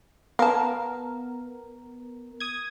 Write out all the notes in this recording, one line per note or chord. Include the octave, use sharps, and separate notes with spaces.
B3 A#4 F5 A5
D#6 G#6